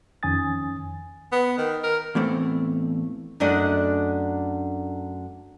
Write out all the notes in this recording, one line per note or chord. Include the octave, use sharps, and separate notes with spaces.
F2 D#3 C#4 G#5 D#6 A6
B3
D#3
A#4
E2 A2 A3 C4
F#2 A3 D4 D5 D#5 F#5